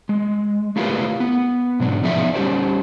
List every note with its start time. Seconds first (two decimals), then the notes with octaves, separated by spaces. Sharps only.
0.09 G#3
0.76 A3 E4 F4 G4 A#4 B4
1.20 B3
1.80 G#2 B2 F#3 D4
2.03 F3 B3 D#4 G#4 D5 E5
2.34 G3 C#4 G4 C5 D5